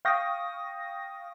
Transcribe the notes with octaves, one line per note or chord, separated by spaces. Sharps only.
F5 G5 C#6 D#6 A#6